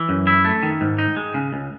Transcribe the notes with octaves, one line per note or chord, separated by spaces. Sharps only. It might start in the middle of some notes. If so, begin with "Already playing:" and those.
Already playing: E3
F#2
E4
A3
D#3
G#2
D#4
G#3
C#3
C#2